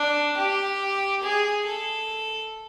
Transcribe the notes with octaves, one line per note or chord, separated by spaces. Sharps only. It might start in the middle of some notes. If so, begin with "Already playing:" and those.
Already playing: D4
G4
G#4
A4